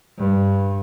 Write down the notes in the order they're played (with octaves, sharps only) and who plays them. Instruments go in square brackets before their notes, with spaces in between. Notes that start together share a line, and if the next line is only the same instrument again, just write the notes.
[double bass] G2